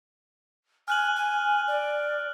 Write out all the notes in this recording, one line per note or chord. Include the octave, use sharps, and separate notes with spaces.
G#5 F6 F#6 F#7
G#5
D5